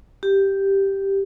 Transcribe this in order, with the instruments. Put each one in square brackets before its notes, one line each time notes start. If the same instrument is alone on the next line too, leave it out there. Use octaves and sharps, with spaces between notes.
[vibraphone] G4